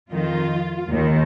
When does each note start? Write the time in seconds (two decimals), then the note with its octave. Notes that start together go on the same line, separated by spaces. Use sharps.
0.11 F2 D#3 F4
0.91 D#2 D#3